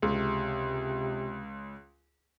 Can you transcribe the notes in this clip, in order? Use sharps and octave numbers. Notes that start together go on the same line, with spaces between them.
C#2 C3